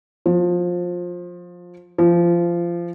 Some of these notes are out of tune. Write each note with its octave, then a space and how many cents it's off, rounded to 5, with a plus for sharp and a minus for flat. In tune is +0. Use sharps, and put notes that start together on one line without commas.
F3 +20
F3 -20